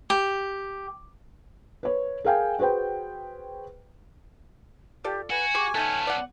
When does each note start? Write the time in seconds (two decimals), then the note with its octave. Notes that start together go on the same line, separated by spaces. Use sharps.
0.10 G4
1.83 B4 C#5
2.24 G#4 A#4 F5 G5 G#5
2.59 F#4 G#4 B4 C5 G5
5.04 F4 G4 A4 D5
5.30 F#4 B4 G#5
5.54 G4 G#4 C#6 D6
5.75 A3 B3 C#4 D#4 A4 A5
6.07 D5 F#5